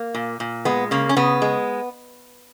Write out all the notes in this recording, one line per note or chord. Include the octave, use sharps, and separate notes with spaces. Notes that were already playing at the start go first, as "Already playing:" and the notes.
Already playing: A#3
A#2
A#2
G#3 B3
C#3 A#3
C#4
C#3 B3
G#3